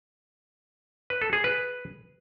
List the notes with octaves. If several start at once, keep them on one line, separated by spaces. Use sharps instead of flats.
B4
A4
G#4
B4